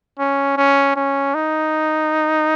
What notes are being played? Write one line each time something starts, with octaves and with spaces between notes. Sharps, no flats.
C#4
C#4
C#4
D#4